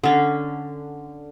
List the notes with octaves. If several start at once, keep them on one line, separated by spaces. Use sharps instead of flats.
D3 C#4